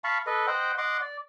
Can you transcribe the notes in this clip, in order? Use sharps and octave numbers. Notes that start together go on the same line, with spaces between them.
F5 A5 B5 C#6
A4 B4 D#5
C5 D#5 F#5 G5
D#5 F#5 C6 D6
D5